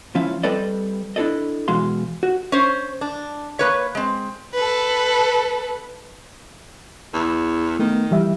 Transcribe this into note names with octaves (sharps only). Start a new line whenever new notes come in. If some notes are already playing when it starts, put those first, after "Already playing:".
C#2 F3 C#4 E4 F5
G3 C4 A4 B4 D5 D#5
D4 E4 F4 A4 D5 D#5
B2 E3 G#3 F#4 F5 C6
F#4
C#4 C5
D4
A#3 B4 C#5
G#3 C4
A4 B4
E2
D#3 A3 B3
E3 G3 E5